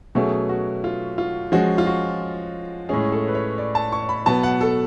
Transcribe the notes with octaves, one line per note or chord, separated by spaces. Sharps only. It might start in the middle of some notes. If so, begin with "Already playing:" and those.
B2 F#3 A3 C#4 G#4
F#4
F4
F4
F3 G#3 C#4 F#4
F4
F#4
A2 G#3 C#4 G#4
A4
B4
C#5
D5
A5
C#6
B5
B2 F#3 B3 A5
F#5
A4